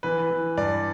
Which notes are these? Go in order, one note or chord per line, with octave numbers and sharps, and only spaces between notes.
E3 B4
E3
G2 D5